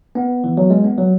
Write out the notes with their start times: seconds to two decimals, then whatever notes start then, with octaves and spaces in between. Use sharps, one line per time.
0.15 B3
0.44 E3
0.57 F#3
0.70 G#3
0.84 B3
0.98 F#3